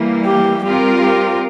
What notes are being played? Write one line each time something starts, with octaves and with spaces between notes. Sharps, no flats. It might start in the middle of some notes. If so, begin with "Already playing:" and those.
Already playing: E3 G3 A#3
G4
G3 C4 F4 G4 A#4
G4